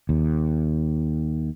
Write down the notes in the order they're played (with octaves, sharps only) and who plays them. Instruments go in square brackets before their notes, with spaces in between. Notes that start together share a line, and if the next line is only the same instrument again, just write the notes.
[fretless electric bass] D#2